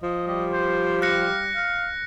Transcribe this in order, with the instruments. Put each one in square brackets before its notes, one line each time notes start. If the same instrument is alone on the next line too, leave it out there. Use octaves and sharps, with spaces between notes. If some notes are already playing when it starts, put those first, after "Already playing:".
[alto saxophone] F3 [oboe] D#5
[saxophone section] G3 G4 [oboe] D#5
[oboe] C5
[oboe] F5 [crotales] F#6 A#6 C#7
[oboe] F5